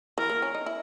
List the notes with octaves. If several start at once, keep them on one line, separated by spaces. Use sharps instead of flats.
E3 A#4
A#3
C#4
D#4
E4